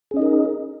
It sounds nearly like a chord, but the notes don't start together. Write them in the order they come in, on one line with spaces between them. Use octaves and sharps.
G#4 C#4 D#5 D#4 A#4